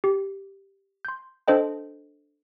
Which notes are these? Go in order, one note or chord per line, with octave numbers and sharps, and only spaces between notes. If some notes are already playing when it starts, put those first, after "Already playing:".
G4
C6 G6
D4 A4 C5 D#5 G5